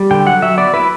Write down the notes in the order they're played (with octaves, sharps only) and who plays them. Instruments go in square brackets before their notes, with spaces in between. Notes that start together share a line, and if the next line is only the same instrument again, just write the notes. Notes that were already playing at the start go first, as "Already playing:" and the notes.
Already playing: [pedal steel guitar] G3
D3 G5
F#3 F#5
F#3 E5
B3 D5
E4 B4